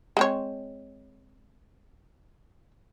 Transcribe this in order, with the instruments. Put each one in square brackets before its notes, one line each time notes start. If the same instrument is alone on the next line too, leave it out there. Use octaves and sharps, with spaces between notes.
[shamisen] G#3 C4 C#5